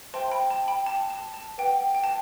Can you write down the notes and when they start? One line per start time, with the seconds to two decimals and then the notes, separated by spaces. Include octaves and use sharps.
0.14 C5 E5 G5 A5 C6
0.32 G5 B5
0.50 A5
0.68 G5 B5
0.87 A5
1.10 A5
1.34 A5
1.58 B4 F#5 G5
1.95 G5
2.04 A5